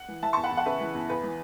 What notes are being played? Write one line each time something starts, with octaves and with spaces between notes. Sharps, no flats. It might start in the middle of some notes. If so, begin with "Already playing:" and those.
Already playing: F#5
E3
E3 E5 A5
E2 A5 C#6
F#5 B5
E2
F#5
C#3 B4 E5
E3
E2
E2 B4
E3